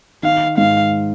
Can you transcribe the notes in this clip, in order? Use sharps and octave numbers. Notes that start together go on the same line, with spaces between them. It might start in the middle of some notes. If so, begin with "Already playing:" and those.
D#3 F5
G#2 F5